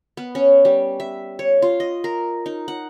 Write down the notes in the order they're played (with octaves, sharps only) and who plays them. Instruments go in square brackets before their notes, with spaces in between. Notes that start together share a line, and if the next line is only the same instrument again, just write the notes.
[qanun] B3
C#4
G3
E5
C#5
F4
D#5
A#4
D#4
F#5